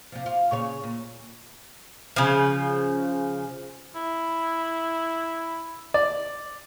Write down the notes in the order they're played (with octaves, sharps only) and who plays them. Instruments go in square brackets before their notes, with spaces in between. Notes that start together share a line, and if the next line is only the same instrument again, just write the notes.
[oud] C3 F3
F4
A#2 C#3 C#5
A#2
[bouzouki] C#3 F3
[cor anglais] E4
[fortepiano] D5